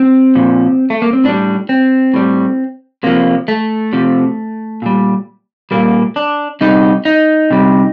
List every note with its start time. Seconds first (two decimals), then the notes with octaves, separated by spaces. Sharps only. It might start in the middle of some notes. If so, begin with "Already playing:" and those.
Already playing: C4
0.35 A#2 F3
0.90 A3
1.02 A#3
1.13 C4
1.24 A2 G3 D4
1.69 C4
2.14 A2 G3
3.03 C3 F3 A#3
3.48 A3
3.93 C3 F3
4.82 A#2 G3
5.71 A#2 G3 A#3
6.16 D4
6.61 C3 G3 D#4
7.05 D#4
7.51 C3 G3